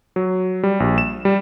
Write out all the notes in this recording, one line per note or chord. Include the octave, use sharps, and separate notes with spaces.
F#3
G3
A#1
E7
G3